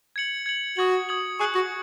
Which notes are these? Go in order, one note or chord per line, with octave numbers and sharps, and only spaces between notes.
G#6 C#7 F#7
G#6 C#7 F#7
F#4 D#6 G#6 F#7
D#6 G#6 F#7
G#4 C#6 F#6 C#7 F#7
F#4